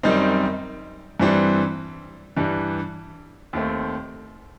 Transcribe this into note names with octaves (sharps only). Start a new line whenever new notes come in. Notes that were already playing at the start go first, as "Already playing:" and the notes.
F#2 D#3 G3 C4 D#4
G2 E3 G3 C4
G2 E3 G3
D#2 D#3 A3 C4